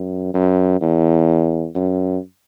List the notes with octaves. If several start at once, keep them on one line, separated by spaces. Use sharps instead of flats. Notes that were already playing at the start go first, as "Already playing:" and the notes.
Already playing: F#2
F#2
E2
F#2